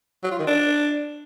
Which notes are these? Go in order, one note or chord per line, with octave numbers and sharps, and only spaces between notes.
F#3
F4
D#3
D4